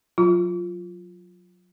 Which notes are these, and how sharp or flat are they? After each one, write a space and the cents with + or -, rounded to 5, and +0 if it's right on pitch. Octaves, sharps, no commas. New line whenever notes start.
F#3 -25 F4 +0